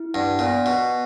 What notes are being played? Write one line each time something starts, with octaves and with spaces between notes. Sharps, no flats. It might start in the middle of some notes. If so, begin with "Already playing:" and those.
Already playing: E4
G2 F#5
A#2 B3
B2 F#5